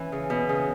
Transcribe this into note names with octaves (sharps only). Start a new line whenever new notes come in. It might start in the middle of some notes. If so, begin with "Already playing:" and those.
Already playing: E3 C#4
C#3
B2
C#3